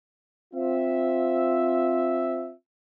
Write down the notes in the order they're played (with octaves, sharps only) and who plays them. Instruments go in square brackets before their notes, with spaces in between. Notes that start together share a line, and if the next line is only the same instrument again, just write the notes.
[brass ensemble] C4 F4 E5